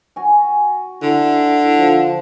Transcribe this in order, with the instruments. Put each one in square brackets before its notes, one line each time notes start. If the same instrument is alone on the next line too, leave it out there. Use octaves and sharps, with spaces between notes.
[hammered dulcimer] F#4 G#5
[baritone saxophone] D3 [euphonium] E4
[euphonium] F3